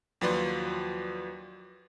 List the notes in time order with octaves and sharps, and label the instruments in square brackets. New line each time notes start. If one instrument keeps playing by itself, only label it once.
[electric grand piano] D#2 F3 F#3 B4 D5 C6